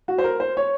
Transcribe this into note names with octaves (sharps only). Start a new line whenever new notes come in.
F#4
C5
A#4
C5
C#5